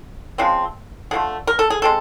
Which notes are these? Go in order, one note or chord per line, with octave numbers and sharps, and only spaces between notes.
C#3 F3 G#3 C4
D3 F3 A3 G#4
A#4
A4
G#4
G#3 C4 A4